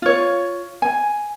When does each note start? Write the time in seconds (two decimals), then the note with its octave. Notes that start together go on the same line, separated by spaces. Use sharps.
0.02 F4 C#5
0.82 G#5